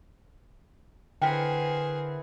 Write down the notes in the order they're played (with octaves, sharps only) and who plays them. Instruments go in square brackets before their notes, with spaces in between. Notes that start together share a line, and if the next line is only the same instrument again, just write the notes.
[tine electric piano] D3 B6 [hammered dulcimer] E3 A#4 F#5 [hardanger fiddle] G#4 C5 [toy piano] G5